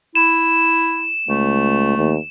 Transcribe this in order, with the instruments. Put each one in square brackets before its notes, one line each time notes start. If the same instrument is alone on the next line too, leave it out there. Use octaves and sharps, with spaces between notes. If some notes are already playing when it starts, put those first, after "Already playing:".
[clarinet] E4 [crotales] E7
[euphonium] C#2 [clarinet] A3
[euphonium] D#2